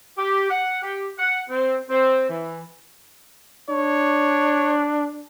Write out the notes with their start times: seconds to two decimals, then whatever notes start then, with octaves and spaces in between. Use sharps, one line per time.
0.18 G4
0.50 F#5
0.83 G4
1.18 F#5
1.50 C4
1.90 C4
2.30 E3
3.70 D4 C#5